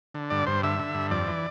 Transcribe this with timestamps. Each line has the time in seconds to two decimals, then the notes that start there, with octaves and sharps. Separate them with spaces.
0.14 D3
0.30 G2 D5
0.47 G2 C5
0.63 D3 E5
0.79 D3
0.95 G2
1.11 F2 D5
1.27 E3